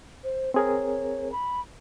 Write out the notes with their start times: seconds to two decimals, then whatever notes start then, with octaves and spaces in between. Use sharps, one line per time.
0.24 C5
0.54 C4 G#4 A#4 C#5
1.32 B5